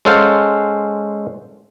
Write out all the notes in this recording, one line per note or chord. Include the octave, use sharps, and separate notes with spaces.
G#3 C#4 A4 C5 F5 F#5